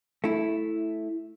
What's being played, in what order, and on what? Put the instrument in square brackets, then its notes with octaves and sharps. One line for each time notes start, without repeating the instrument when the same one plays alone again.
[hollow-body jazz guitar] A3 E4